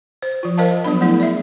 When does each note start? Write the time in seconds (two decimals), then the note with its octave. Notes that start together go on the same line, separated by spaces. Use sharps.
0.23 C5
0.43 F3 F4
0.57 A#4 C5 D#5 F5 G5 A5
0.84 F3 F#3 B3 D4 B5
1.01 A3 B3 D4 E4 G#4
1.20 D5 E5